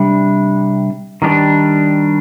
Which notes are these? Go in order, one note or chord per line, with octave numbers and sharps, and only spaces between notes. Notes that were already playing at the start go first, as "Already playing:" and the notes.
Already playing: C3 G3 D4
D#3 G3 D4 G4